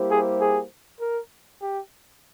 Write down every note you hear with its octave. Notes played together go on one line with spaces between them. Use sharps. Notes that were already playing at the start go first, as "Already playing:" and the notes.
Already playing: G3 A#3 E4 G4 C5
G#4
G#4
A#4
G4